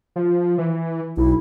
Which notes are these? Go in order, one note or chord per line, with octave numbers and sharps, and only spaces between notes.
F3
E3
B1 E4